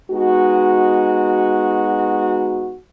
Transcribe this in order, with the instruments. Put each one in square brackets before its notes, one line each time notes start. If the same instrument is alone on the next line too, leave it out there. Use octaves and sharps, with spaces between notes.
[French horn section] G#3 B3 D#4 F#4